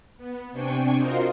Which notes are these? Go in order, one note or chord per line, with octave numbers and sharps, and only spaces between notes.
B3
C3 C4 D4 G5 G#5 C#6
F4 F#4 A#4 C5 D#5 F5